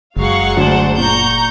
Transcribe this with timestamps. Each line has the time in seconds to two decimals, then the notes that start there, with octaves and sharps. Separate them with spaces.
0.17 F#1 F#3 G#3 F5 F#5 C#6
0.57 D2 D4 C5
0.98 A#2 A#5 C#6 G6